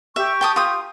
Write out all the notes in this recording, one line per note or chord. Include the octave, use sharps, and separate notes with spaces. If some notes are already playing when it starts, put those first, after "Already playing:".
G4 E5 C#6
G5 A5 D#6
F4 D#6